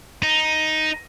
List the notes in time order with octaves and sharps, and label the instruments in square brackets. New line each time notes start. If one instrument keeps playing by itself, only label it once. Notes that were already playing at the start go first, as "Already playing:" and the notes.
[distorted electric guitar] D#4